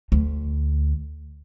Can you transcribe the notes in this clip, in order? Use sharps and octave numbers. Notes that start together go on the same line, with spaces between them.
D2